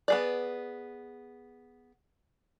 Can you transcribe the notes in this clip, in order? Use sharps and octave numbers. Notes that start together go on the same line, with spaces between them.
B3 G#4 D5